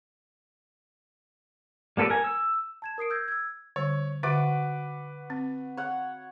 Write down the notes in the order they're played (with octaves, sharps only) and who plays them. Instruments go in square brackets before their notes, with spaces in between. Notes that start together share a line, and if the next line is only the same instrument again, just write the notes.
[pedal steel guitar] G3 A#3 A4 B4 D5
A#4 G#5
E6
[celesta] A5 G#6 E7
A#4 D#6 C7 D7
E6 G6 G#6 A#6
E6 G#6
[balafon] D3 G3 [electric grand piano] C#5
[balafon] D3 E5 [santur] F#4 [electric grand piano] B4 D6
[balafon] C4
[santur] C#5 F#5